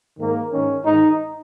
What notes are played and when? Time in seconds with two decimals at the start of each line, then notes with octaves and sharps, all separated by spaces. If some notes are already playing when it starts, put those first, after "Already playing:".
0.19 G#2 D#3 A#3
0.53 G#2 D#3 C#4
0.85 G#2 D#3 D#4